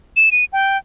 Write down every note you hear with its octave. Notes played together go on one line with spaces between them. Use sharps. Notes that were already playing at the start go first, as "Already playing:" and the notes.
E7
D#7
G5